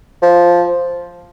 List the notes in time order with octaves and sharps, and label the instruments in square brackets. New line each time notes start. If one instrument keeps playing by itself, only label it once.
[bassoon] F3